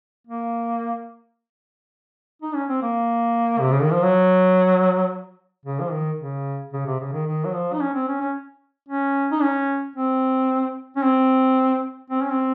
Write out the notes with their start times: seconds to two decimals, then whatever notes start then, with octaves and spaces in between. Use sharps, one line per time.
0.27 A#3
2.42 D#4
2.55 C#4
2.69 C4
2.82 A#3
3.60 C3
3.71 C#3
3.82 D#3
3.93 F3
4.03 F#3
5.65 C#3
5.80 F3
5.92 D#3
6.19 C#3
6.73 C#3
6.86 C3
6.99 C#3
7.13 D#3
7.26 D#3
7.45 F#3
7.54 F3
7.73 D#4
7.81 C#4
7.94 C4
8.08 C#4
8.21 C#4
8.88 C#4
9.32 D#4
9.41 C#4
9.96 C4
10.96 C#4
11.04 C4
12.10 C4
12.22 C#4
12.32 C4